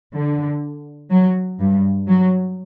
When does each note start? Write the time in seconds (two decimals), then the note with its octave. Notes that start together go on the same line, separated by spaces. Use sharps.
0.13 D3
1.10 F#3
1.59 G2
2.08 F#3